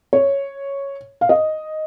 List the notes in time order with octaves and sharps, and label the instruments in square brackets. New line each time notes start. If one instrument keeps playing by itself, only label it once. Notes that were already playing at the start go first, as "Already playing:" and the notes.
[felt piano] C#5
F5
D#5